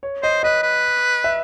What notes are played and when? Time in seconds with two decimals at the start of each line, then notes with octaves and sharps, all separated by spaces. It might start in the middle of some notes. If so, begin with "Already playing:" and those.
0.03 C#5
0.23 C5 D#5
0.43 B4 D#5
0.63 B4
1.24 E5